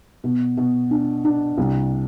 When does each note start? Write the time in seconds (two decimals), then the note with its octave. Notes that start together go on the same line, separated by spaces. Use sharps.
0.24 B2
0.57 B2
0.91 D4
1.25 D4
1.58 C2